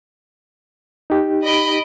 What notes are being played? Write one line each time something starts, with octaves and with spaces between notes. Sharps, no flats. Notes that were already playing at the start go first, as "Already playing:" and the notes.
D#4 G4
D#5 B5 D7